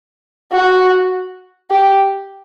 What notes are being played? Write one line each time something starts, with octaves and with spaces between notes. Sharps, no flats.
F#4
G4